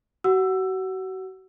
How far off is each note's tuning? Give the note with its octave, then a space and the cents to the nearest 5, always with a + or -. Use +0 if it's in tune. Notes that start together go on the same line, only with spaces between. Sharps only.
F#4 +35 F#5 +0 E6 +15